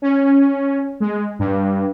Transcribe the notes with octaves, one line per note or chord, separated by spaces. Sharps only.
C#4
G#3
G2